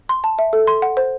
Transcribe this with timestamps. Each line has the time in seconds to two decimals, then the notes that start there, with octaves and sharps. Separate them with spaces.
0.09 C6
0.24 A5
0.39 E5
0.53 A4
0.67 C6
0.82 F#5
0.97 C5